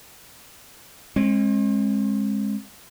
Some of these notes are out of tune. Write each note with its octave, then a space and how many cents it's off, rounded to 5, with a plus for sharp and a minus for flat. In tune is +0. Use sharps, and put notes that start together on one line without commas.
G#3 +0 C4 +45